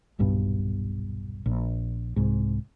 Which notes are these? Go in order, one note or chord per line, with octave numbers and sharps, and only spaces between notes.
D#1 B1 G2 B2
A#1
C2 G#2